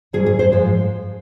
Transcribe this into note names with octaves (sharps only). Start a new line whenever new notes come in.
G#2 D#3 G3 G#4
G#4
C5
G#2 F3 G#3